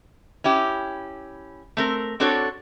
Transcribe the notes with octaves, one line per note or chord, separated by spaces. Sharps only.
C#4 E4 G4
A3 C4 A#4
C4 D4 F#4 A4 C#5